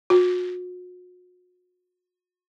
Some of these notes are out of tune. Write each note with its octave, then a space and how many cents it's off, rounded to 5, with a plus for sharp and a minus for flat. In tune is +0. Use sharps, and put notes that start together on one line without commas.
F#4 -40